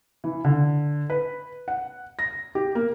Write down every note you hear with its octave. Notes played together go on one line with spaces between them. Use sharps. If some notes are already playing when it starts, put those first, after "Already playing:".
E3
D3
B4
F#5
A#6
G4
A#3